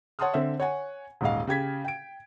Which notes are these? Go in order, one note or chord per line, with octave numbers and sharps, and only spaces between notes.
C#5 F#5 A5 C6 D#6 F6
D3 C4 E5
C#5 F#5 G#5
D#1 G#2 D#5 F5
C#3 G4 G#6 B6
G5 D7